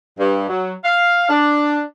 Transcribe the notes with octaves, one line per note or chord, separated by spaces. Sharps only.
G2
F#3
F5
D4